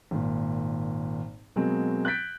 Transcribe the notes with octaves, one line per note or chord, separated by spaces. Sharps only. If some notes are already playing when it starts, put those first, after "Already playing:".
G#1 A#2
B2 F#3 G#3 A#3 C4
F#6 G6 A6 B6 D7